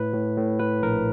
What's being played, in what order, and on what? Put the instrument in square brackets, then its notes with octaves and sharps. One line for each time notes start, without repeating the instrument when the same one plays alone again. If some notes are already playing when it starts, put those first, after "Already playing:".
Already playing: [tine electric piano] A2 B4
A2
A2
A2 B4
A#1 A#4